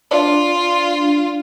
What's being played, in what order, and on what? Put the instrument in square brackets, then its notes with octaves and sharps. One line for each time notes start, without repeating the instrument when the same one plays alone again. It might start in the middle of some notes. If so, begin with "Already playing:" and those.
[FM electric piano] D4 [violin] F4